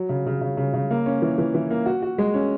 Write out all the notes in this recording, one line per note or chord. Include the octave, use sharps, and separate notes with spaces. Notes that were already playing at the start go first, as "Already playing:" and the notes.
Already playing: F#3
C#3
C#3
C#3
C#3
C#3
A#3
C#4
E3
E3
E3
A#3
F#4
F#4
G#3
C#4